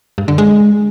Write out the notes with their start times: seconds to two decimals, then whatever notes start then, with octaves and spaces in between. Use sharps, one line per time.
0.18 G2
0.28 D3
0.38 G#3